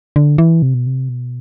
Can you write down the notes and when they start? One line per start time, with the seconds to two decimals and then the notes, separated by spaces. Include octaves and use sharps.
0.16 D3
0.38 E3
0.62 C3
0.74 B2
0.87 C3
1.09 B2